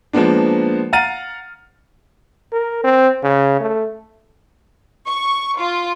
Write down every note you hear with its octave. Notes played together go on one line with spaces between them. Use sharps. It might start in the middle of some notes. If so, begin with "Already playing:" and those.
F3 G#3 A#3 B3 D4
F5 F#5 A#5 F6 A6 D#7
A#4
C4
C#3
A3
C#6
F4